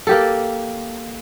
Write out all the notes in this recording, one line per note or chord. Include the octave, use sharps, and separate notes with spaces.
A#3 G4 A4